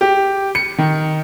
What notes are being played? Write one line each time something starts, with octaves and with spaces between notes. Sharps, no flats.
G4
C#7
D#3